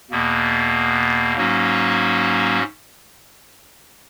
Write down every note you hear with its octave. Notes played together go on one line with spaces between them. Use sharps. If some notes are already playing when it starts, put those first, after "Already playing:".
E2 B2 A#3
G#2 F#3 A#3 C#4 F#4